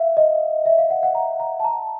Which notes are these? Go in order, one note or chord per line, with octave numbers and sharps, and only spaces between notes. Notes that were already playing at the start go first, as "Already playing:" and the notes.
Already playing: E5 F5
D#5
E5
F5
F#5
F#5
A#5
A#5
A5
A#5